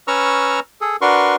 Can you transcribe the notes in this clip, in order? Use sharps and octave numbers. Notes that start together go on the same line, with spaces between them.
C#4 B4 A#5 C#6 E6 F6
G#4 A4
D4 F#4 A#4 B4 C6 C#6